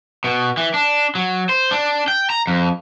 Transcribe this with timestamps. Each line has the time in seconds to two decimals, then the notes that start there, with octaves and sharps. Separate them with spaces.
0.24 B2
0.57 E3
0.74 D4
1.15 F#3
1.49 C5
1.71 D4
2.08 G5
2.30 A#5
2.47 F2